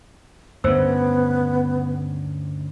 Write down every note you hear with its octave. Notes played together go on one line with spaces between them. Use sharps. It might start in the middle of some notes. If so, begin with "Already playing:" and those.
D2 G2 C#3 B3 C5 E5 E6